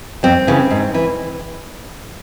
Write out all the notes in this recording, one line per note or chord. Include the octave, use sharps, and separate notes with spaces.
F2 C4
C#3 E3
G#2
E3